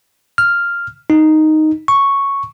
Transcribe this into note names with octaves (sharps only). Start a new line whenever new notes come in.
F6
D#4
C#6